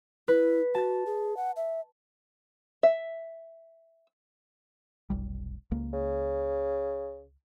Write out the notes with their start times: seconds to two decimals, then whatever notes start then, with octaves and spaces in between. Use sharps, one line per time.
0.28 E4 B4
0.75 F#4 A5 A6
1.06 G#4
1.37 F#5
1.56 E5
2.83 E5
5.10 F1 B1 G3
5.71 C#2 A#3
5.93 C#3